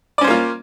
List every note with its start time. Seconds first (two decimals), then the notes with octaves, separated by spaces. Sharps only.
0.18 D5
0.21 C#4
0.24 C5
0.27 A#3
0.30 F4